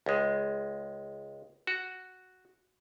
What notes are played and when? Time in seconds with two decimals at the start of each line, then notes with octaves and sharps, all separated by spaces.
0.06 C#2 G#3
1.67 F#4